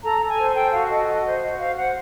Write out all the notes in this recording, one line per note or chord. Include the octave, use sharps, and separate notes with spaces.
A4 A#5
A4
G#5
C5
A4 G5
F#4 F5
A4 D#5
F#4
C5
F#4
C5 F5
C5 F#5